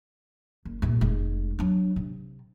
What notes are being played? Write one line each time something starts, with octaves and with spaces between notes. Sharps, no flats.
F#1
C2 A#2
F1 G#3
F#3 D4
C3